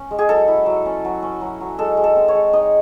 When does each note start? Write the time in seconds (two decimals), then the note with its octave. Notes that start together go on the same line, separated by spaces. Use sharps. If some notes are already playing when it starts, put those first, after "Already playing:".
Already playing: C#4
0.11 G#3
0.18 G#4
0.29 F#3 A4
0.48 E4
0.66 F#3
0.86 C#4
1.05 F#3
1.22 C#4
1.41 F#3
1.61 F#3
1.78 G#3 A4
1.97 G#3
2.04 A4
2.16 C4
2.28 C#5
2.35 G#3
2.53 D#4 D#5